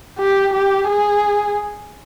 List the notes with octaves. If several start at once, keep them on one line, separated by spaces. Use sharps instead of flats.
G4
G4
G#4